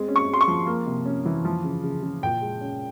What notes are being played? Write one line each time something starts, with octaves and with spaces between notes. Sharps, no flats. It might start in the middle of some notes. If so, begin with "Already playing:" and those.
Already playing: G#3 C4
C#4
C#6
G#3
C6
C#6
F3
A#3
C3
C#4
E3
F3
C#3
C#3
C#3
A#2 G5
G#3
C#4